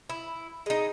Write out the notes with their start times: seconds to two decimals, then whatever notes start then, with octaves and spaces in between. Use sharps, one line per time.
0.10 E4
0.66 G#3 D#4